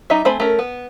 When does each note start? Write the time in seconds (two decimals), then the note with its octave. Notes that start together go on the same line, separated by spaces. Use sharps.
0.10 G3 D#4 D#5 E5
0.25 A3 C4 C5 G#5 B5
0.40 A3 C#4 A#4
0.59 B3